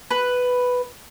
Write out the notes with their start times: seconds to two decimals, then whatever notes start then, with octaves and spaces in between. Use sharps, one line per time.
0.11 B4